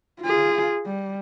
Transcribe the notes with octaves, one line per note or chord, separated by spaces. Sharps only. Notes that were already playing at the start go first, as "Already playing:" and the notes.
F4 G#4
G3